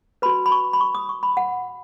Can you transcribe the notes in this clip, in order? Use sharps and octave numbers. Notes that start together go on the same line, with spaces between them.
F#4 B4 B5
B5
C#6
B5
C#6
D#6
C#6
B5
F#5